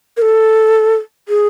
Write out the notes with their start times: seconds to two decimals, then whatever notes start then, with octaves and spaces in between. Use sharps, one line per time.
0.17 A#4
0.22 A4
1.29 G#4